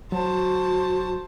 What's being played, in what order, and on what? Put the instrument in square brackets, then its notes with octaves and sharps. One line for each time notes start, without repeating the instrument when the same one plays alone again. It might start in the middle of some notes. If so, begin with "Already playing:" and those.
[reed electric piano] F#3 [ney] F#4 [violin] C5 A5